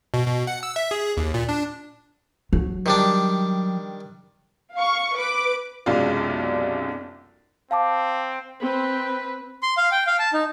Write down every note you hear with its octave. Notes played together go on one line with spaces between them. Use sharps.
B2
B2
F#5
E6
E5
G#4
D#2
A#2
D4
F#3
D#3 G3 D4
F5 C#6
B4 D6
B1 F#2 C3 G#3 F4 D5
C4 F5 A5 D6
C4 B4
C6
F5
G5
F5
A5
D#4